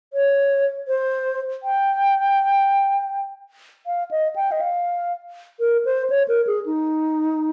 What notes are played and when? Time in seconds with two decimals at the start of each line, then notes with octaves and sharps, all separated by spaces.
0.13 C#5
0.88 C5
1.63 G5
3.87 F5
4.11 D#5
4.36 G5
4.52 D#5
4.61 F5
5.60 A#4
5.85 C5
6.10 C#5
6.28 A#4
6.47 G#4
6.66 D#4